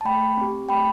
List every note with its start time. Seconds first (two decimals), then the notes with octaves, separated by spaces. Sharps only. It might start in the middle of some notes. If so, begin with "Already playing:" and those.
0.01 A5
0.05 A3 G5 B5
0.37 C4 G4
0.69 A3 G5 B5